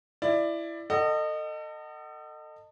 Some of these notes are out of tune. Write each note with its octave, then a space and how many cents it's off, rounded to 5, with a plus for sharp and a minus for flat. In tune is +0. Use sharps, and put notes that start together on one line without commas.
E4 +15 D5 +15
A4 +30 D#5 -20 F#5 +25